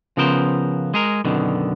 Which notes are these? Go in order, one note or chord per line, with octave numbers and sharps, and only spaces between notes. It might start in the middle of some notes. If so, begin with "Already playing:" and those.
C#3 F3 B3 A#4 C5
G#3 G#4 A#4
F#2 B2 D3 D#3